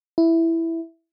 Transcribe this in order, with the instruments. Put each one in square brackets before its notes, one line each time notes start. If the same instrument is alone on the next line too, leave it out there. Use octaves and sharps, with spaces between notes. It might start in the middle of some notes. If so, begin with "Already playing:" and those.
[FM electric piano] E4